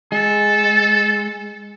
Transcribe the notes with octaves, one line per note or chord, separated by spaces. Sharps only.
G#3 A4